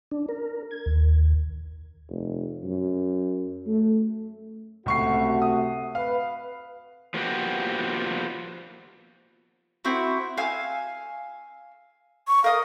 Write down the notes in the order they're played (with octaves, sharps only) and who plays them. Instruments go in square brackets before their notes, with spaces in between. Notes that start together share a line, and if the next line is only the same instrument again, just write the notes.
[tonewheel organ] D4
A#4
G#6
D#2
[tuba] F1
F#2
A3
[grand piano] C#2 C#6 C7 [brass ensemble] C3 A3 F#4
[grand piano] D#6
[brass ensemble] B4 [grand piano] F5
[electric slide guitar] F3 A#3 B3 F#4 G4
[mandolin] C4 E4 F#4
F5 G#5 E6
[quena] C#6
[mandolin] A#4 D#5 [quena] F5